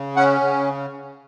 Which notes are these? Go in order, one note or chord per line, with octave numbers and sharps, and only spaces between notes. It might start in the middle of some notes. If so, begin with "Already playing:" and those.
Already playing: C#3
C#4 F#5
C#3